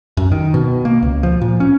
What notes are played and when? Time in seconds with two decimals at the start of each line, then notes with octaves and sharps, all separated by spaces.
0.17 F#2
0.32 D#3
0.54 B2
0.85 A#3
1.02 C#2
1.23 F3
1.41 A#2
1.60 C#4